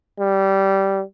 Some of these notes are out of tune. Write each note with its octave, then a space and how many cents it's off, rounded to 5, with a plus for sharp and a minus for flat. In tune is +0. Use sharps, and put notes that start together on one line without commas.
G3 -15